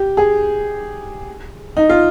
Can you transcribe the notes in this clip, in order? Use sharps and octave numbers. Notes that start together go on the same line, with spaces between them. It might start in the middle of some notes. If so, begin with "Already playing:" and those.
Already playing: G4
G#4
D#4
F4